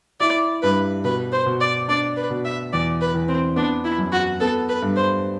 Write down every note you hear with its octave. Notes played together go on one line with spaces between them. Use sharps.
E4 D5
G2 B4
B2 B4
C5
B2
D5
D4 D5
B4
B2
E5
E2 D5
B4
E2
C4
B3 D4
E4
F#2
F#4
B3 A4
B4
G2
C5